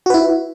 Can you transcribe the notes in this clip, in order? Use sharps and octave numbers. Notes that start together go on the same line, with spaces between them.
E4 F#4 B4